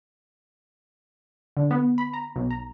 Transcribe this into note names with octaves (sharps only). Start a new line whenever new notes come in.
D3
B3
B5
A#5
B1
A#5